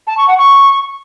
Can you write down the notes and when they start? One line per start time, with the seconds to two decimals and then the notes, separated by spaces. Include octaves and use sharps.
0.07 A5
0.17 C#6
0.28 F#5
0.38 C#6